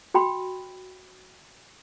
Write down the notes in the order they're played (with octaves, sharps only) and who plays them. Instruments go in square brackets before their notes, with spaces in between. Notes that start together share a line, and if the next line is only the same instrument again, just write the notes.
[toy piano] F#4 G5 B5